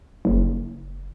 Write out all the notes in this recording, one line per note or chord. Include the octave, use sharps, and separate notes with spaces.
F#1